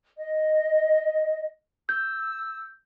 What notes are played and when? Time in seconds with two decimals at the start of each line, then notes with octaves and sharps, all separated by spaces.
0.16 D#5
1.89 E6 G6